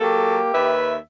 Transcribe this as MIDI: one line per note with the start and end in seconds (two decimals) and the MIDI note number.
0.01 0.39 54
0.01 0.51 58
0.01 0.75 67
0.01 0.39 69
0.54 0.98 39
0.54 0.94 71
0.54 0.98 76